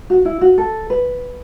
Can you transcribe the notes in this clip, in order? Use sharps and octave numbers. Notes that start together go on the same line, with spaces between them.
F#4
E4
F#4
A4
B4